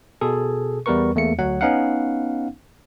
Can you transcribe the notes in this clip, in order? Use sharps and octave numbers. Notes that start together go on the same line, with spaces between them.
B2 G#4 A4
E2 G3 B3 A#4 B4 C#6
E2 A3 A#3 C#7
D2 F#3 F#5
B3 C#4 D#4 F5 F#5